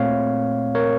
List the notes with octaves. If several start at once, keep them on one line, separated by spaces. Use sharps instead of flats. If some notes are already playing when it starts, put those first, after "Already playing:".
Already playing: A#2 A3 C4 C#5 F5
A#4 C#5